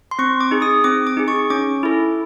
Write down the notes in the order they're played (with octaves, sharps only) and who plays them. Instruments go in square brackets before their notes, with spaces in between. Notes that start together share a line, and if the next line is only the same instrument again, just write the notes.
[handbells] C6
C4 C#6
D6
D#4 G#4
D#6
C4 D6
D6
D#4 G#4
C#6
C#4 D6
E4 A4